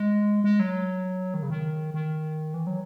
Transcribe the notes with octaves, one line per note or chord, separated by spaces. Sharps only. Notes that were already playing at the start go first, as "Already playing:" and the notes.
Already playing: G#3
G#3
F#3
D#3
C#3
D#3
D#3
E3
F#3